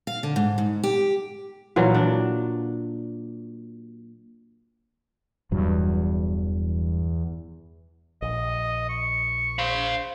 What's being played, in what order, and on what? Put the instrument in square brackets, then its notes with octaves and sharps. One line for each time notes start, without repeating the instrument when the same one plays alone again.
[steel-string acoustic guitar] F5
D3
G#2
G#2
G4
[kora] A#2 E3 F#3 F4
D4
[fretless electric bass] E1 G2 F#3 [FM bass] E2
[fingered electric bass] A#1 [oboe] D#5
[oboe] C#6
[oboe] C5 [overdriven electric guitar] F5 B5